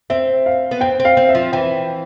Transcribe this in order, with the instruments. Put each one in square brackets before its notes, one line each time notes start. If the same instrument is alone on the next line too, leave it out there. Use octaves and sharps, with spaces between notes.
[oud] C4 [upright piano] E5
[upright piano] F5
[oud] B3
[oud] C4 [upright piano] G5
[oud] C4
[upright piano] F5
[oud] C4
[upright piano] E5
[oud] F3
[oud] E3 [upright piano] G5